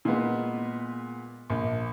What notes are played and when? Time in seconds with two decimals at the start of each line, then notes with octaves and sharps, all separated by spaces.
0.05 A#2 G#3 B3
1.50 A#1